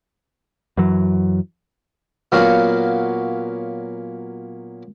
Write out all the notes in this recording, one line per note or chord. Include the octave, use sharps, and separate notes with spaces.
F#2 E3 F#3
A#2 F#3 B3 C#4 F#4 F5